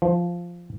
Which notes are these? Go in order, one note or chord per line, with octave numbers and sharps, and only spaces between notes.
F3